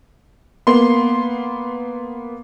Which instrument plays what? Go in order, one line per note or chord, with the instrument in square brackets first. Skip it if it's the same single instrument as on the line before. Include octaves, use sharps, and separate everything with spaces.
[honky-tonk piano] A#3 B3 C6